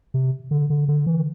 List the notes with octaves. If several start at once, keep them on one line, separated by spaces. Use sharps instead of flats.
C3
D3
D3
D3
E3